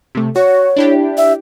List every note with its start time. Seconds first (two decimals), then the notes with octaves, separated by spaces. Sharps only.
0.15 C3 A3
0.36 F#4 C#5
0.76 D4 E4 G4
1.17 E5